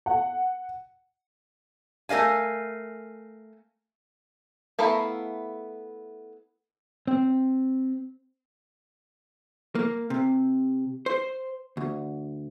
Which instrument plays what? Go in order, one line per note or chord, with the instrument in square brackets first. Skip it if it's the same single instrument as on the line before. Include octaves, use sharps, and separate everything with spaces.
[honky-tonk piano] F#5
[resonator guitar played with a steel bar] A3 A#4 D#5 F5 G#5
[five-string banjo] A3 B3 E4 F5 A#5
[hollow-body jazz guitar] C4
A#3
C3
C5
D2